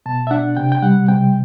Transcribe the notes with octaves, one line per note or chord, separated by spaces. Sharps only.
B2 A5
E5
D4 F#5
C3 G5
G5
G3 F#5
C3 G5